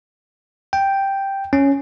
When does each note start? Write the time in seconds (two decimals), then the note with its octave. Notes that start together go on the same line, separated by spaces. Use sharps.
0.73 G5
1.53 C#4